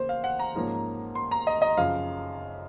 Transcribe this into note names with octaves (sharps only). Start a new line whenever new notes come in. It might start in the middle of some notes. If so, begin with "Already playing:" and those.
Already playing: C#3 A#3 C5
F5
F#5
A#5
G#2 F3 A#3 C#4
C6
A#5
D#5
D#5
F#2 C#3 F3 F5